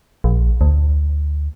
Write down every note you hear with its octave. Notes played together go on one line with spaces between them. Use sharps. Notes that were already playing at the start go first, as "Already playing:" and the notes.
A#1
D2